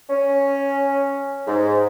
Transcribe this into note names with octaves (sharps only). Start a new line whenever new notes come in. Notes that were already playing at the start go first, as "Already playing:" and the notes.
C#4
G#2